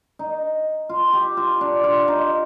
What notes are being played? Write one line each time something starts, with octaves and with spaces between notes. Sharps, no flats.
D#4
F4
G4
F4
D4
F4
D#4